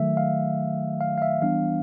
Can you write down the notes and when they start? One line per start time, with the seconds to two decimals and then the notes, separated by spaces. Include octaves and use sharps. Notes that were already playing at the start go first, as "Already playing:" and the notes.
Already playing: D#3 F#3 A3 E5
0.17 F5
1.01 F5
1.18 F5
1.22 E5
1.42 E3 G3 B3 D4 F5